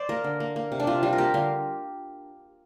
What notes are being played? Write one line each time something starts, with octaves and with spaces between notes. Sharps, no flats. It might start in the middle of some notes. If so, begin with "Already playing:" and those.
Already playing: C5 D5
A#3 A#4
D3
A#3
A#3
C3
D4
C3 F4
G3 F4
A#4
A#3 G4
D3 F5